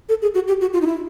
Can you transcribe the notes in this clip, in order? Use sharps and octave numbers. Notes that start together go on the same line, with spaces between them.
A4
G#4
F#4
G4
F#4
F4
D#4
E4